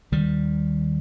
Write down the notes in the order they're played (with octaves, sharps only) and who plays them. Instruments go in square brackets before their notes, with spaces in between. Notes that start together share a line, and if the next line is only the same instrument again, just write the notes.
[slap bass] D#2 D#3 G3